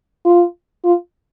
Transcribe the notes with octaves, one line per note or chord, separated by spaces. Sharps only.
F4
F4